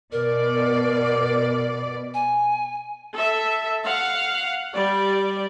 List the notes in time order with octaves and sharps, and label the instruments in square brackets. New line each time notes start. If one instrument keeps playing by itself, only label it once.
[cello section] B2 D5 [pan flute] A#4
[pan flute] G#5
[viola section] A4 E5
F5 F#5
G3 D5